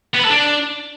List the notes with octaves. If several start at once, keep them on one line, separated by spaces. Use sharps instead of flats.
B3
B4
A4
D4